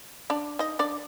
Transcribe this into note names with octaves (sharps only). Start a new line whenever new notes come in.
D4 D5
D#4 D#5
D4 D5